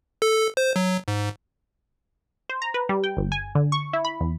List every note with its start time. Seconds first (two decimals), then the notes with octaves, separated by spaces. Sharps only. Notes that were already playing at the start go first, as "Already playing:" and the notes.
0.22 A4
0.57 C5
0.76 F#3
1.08 G#2
2.49 C5
2.62 A#5
2.74 B4
2.89 G3
3.04 G5
3.17 G1
3.32 G#5
3.55 D3
3.72 C#6
3.93 E4
4.05 B5
4.20 E2